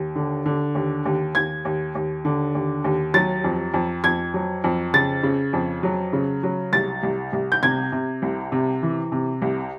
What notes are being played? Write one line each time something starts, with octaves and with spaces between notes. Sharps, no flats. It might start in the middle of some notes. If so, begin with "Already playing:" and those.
Already playing: D#2
D3
D3
D#2
D#2
D#2 G#6
D#2
D#2
D3
D#2
D#2
F#3 A6
F2
F2
F2 G#6
F#3
F2
C#3 A6
C#3
F2
F#3
C#3
F#3
C2 A6
C2
C2
G6
C3 G#6
C3
C2
C3
E3
C3
C2